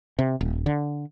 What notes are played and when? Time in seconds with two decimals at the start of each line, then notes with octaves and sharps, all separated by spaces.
0.19 C3
0.41 D#1
0.66 D3